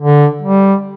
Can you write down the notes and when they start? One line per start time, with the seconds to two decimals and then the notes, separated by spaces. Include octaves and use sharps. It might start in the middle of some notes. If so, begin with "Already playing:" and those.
0.02 D3
0.42 G3